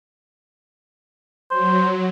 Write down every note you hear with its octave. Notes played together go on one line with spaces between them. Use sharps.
F#3 C5